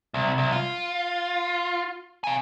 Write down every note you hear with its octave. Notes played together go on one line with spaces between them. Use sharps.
C2
C2
F4
F5 G#5